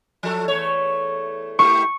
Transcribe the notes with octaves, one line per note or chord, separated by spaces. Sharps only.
F3 A4
E2 A3 C#5
A3 E4 G4 C#6